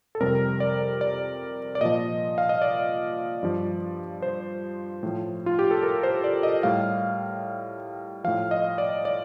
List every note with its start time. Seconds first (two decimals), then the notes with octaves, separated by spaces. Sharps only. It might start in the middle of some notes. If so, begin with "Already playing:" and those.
0.15 A4
0.20 F2 C3 G3 A#4
0.60 D5
1.01 D5
1.75 D5
1.81 A#2 F3 D#5
2.38 F5
2.49 D#5
2.62 D5
3.43 G2 F3
4.22 C5
5.03 A2 F3
5.46 F4
5.59 G4
5.71 A4
5.83 A#4
6.03 C5
6.24 D5
6.43 D#5
6.63 A2 G3 F5
8.24 A2 F3 F5
8.51 D#5
8.78 D5
9.05 D5